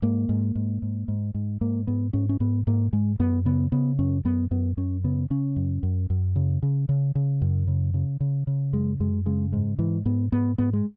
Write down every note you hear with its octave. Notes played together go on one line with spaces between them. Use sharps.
G#2 A#3
G#2
G#2
G#2
G#2
G#2
G#2 A#3
G#2 B3
G#2 C#4
C#4
G#2 B3
G#2 A#3
G#2 G#3
F#2 B3
C#3 B3
C#3 B3
F#2 C#4
F#2 B3
F#2 B3
F#2 C#4
C#3 B3
C#3 C#4
F#2
F#2
F#2
C#3
C#3
C#3
C#3
F#2
C#3
C#3
C#3
C#3
F#2 G#3
F#2 G#3
C#3 G#3
G#2 G#3
G#2 E3
G#2 B3
G#2 B3
G#2 B3
G#3